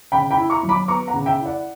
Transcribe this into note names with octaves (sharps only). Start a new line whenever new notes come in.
C#3 G5 B5
G5 B5
E4
A#5 C#6
F#3
B5 D6
B3 A#5 C#6
F#5 A#5
C#3
E5 G5
E4
D5 F#5